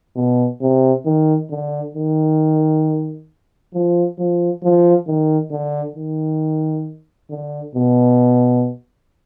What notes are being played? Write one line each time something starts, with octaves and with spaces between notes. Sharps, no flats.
B2
C3
D#3
D3
D#3
F3
F3
F3
D#3
D3
D#3
D3
B2